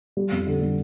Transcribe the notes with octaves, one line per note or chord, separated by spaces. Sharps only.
G3
F2
D3
G3